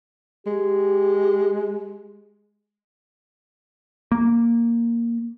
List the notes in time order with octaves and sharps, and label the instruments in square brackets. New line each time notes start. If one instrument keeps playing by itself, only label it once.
[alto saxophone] G#3 [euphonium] G4
[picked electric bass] A#3